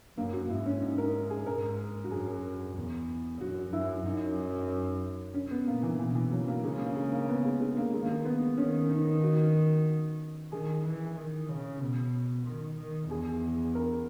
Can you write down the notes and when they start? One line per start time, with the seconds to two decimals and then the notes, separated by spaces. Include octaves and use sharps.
0.17 F#2 A#3
0.33 F#4
0.50 G#2 E4
0.66 C#4
0.82 D#4
0.98 A#4
1.30 G#4
1.46 G#2 A#4
2.04 F#4
2.11 F#2 G#4
2.76 E2
3.41 F#2 F#4
3.73 F#2 E4
4.05 F#2 D#4
5.34 C#4
5.51 B3
5.67 A#2 A#3
5.83 E3
5.99 B2 E3
6.15 E3
6.32 F#3
6.48 A#3
6.64 C#3 G#3
6.80 A#3
6.96 G#3
7.12 A#3
7.29 B3
7.45 G#3
7.61 G#3
7.77 A#3
7.93 D#3 G#3
8.02 A#3
8.11 G#3
8.25 B3
8.57 D#3 C#4
8.90 D#4
9.23 F#4
10.52 D#3 G#4
10.84 E3
11.16 D#3
11.49 C#3
11.81 B2
12.46 D#3
12.78 D#3
13.10 E2 G#4
13.75 A#4